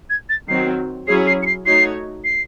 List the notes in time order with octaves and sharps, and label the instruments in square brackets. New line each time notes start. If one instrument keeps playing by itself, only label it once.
[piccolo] G#6
A6
[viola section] D#3 F#3 C4 [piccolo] C7
[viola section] F#3 C#4 E4 G#4 C#5 [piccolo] C7
[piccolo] C7
C#7
C7
[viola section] A3 D#4 F#4 C#5 [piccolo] C7
[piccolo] C7